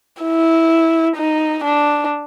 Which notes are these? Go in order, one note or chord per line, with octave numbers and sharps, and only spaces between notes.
E4
D#4
D4